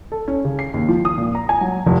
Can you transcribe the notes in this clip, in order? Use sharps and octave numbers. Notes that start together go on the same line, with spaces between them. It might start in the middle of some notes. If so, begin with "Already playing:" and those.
A4
C#4
C#3
C7
D#2
F3
D#6
A#2
A#5
G#5
F#3
F1